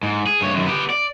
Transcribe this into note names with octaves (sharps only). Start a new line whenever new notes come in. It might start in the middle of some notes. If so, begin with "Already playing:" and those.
G#2
G#4
G2 C#5
F#2 D#3
B3 G4
D5